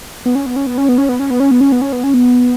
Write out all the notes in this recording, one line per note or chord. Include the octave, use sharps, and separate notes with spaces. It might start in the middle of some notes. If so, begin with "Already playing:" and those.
B3
C#4
B3
C#4
B3
C#4
B3
C#4
B3
C#4
B3
C#4
B3
C#4
B3
C#4
B3
C#4
B3